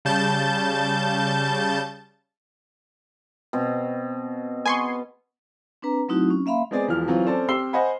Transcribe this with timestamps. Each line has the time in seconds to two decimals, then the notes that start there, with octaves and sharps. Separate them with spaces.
0.05 C#3 G3 A5 G6 A6
3.53 B2 C4
4.66 B3 G#5 C6 C#6
5.82 C4 D4 B4 A#5
6.09 F#3 A3 C4 D#4 E4 F#4
6.30 C#4
6.46 A#3 E5 F5 B5 C6
6.71 G#3 B3 C4 G#4 D5 G#5
6.88 E1 E3 F3 F6
7.08 E3 F#3 C4 F4
7.24 C4 C#4 A4 C5 D5 A5
7.49 C4 G4 C6 E6 C7 G7
7.73 C5 D#5 F#5 G#5 B5